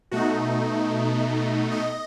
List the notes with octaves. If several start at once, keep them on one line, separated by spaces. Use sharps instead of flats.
B2 A3 D#4 F#4
D#5